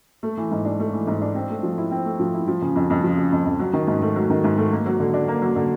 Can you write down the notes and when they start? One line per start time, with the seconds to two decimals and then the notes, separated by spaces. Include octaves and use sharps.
0.23 A3
0.37 E3
0.51 G#2
0.65 D4
0.80 A3
0.93 E3
1.07 G#2
1.22 D4
1.35 C4
1.50 A3
1.63 F3
1.78 E4
1.91 C4
2.05 A3
2.20 F3
2.34 E4
2.47 F3
2.62 C#3
2.76 F2
2.90 F2
3.04 F3
3.17 C#3
3.32 F2
3.45 F2
3.59 F#3
3.73 D#3
3.87 G#2
4.02 A3
4.16 F#3
4.30 D#3
4.44 G#2
4.58 A3
4.72 A#3
4.86 F#3
5.00 D3
5.14 D4
5.28 A#3
5.42 F#3
5.56 D3